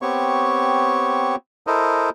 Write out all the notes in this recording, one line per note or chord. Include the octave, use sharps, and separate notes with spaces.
B3 C4 G4 C#5 C#6
E4 A4 A#4 C5 D#5